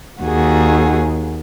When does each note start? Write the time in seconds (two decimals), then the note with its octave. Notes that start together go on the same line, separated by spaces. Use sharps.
0.22 D#2 F#4 G#4